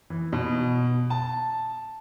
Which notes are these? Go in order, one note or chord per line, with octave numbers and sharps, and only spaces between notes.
E3
B2
A5